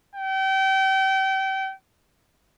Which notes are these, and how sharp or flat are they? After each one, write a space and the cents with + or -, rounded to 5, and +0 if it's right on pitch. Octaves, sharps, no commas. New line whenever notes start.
G5 -30